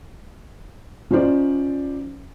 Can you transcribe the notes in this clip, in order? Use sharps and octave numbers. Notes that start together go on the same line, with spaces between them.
F3 C#4 D#4 C5 D5